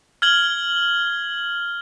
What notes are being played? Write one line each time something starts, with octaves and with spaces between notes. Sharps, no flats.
F6 G#6 F#7 G7